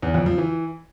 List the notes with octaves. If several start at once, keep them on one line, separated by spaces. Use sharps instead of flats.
E2
F2
F3
E3